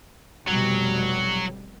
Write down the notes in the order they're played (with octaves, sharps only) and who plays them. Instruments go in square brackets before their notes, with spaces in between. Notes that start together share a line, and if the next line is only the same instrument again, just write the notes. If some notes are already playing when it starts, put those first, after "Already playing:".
[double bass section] F1 B2 G3 [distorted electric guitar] F#3